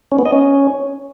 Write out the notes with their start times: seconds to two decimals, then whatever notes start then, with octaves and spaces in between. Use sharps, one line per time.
0.12 C#4
0.19 B3
0.25 D#5
0.32 C#4